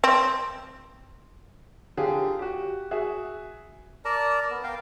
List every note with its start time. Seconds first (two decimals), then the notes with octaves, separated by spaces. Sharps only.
0.04 C4
1.97 D3 F4 G4 G#4
2.39 F#4 G4
2.91 F#4 G#4 E5
4.05 A#4 D5 A5 A#5
4.51 B3
4.63 A#4 F5 G5